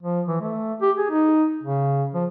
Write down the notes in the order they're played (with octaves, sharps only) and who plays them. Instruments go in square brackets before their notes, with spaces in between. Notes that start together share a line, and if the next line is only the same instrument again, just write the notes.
[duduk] F3
E3
A3
G4
G#4
D#4
C#3
F3